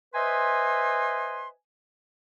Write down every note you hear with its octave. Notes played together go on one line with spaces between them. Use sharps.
B4 C5 D#5 E5 G#5 C6